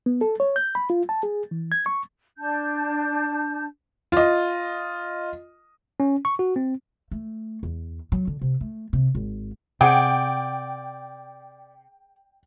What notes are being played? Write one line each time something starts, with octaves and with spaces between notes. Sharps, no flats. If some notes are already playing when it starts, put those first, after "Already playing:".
B3
A4
C#5
G6
B5
F4
A5
G#4
E3
G#6
C#6
D4 A5 G6
F4 D#5
C#4
C#6
F#4
C4
A3
E2
F#3
D3
C3
A3
C3
G#1
C3 G#4 D5 F#5 G5